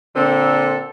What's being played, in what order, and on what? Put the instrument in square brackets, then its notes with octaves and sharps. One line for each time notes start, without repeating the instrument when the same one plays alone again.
[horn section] A#2 D3 C4 A4